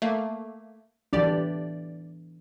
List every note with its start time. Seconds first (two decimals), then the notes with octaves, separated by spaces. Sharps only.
0.02 A3 A#3
1.13 C2 E3 D4 G4 D5